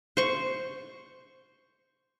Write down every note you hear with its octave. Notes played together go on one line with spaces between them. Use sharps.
C5 C#6